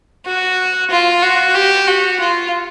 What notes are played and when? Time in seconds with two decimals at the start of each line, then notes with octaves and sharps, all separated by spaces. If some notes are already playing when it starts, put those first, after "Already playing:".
0.26 F#4
0.90 F4
1.22 F#4
1.55 G4
1.87 F#4
2.20 F4